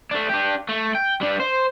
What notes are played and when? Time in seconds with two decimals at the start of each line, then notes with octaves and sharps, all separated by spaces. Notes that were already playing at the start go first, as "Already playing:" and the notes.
0.11 A3 D4
0.30 D4 G4
0.69 A3
0.95 G5
1.21 G3 D4
1.40 C5